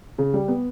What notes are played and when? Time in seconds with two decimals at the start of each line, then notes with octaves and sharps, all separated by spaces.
0.18 C#3
0.34 G3
0.48 B3